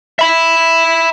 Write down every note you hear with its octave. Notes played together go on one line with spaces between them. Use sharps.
E5 B5